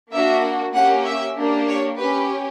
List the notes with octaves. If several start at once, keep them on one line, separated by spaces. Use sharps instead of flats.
A#3 D4 F#4 E5
A#3 C#4 G4 F#5
E5
A#3 D4 G4
C#5
C#4 G4 B4